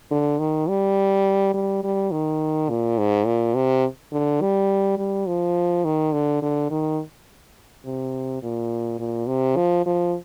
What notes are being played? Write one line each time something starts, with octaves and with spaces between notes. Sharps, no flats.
D3
D#3
G3
G3
G3
D#3
A#2
G#2
A#2
C3
D3
G3
G3
F3
D#3
D3
D3
D#3
C3
A#2
A#2
C3
F3
F3